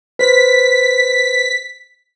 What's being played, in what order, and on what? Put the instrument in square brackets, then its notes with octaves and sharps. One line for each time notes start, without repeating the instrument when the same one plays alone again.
[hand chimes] B4 C5 [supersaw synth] B6